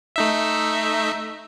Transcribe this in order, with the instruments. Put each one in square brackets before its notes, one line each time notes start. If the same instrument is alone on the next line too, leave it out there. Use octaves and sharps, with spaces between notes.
[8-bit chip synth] A3 D#4 E5